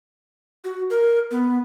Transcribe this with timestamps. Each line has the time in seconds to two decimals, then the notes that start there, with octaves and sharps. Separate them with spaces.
0.64 F#4
0.90 A#4
1.31 B3